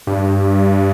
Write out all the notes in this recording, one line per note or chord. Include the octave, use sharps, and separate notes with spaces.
G2